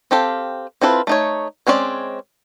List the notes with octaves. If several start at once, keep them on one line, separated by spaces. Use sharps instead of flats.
C4 G4 A4 F5
C4 E4 F4 A4 B4
A3 D#4 C#5
G#3 C4 C#4 F4 D5